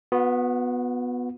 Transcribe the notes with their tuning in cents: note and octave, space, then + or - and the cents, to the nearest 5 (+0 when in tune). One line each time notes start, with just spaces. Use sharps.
B3 +0 F#4 -40